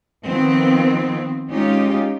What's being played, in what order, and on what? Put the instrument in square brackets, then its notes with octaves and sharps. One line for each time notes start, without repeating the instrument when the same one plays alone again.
[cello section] D#3 F3 B3 C4
G#3 C#4 D#4 F4 G4